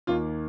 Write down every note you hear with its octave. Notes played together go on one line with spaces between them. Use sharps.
D#2 D#3 A#3 F4